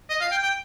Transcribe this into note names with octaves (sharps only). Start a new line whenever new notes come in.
D#5
F5
G5
G5